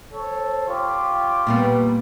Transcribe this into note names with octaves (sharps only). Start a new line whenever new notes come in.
A4 C5 C#5
F4 G4 C#5
A#2 G3 B3